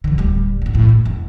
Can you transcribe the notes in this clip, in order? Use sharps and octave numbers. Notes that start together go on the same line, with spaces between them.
D3 E3
D1 G3
D2 A#2
F#2 A2
E1
E1